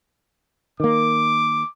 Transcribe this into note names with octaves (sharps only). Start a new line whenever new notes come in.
D#3 A#3 D6